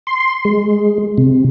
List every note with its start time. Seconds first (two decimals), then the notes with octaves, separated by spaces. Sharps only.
0.07 C6
0.45 G#3
1.18 C3